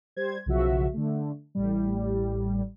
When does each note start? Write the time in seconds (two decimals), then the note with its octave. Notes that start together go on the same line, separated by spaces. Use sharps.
0.16 G3 C5 G#6
0.46 B1 C#3 F3 F#4 E5
0.94 D3 A3
1.55 A1 A2 G3